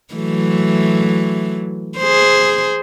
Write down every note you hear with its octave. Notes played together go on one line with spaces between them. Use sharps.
E3 F#3 A3
G#4 C5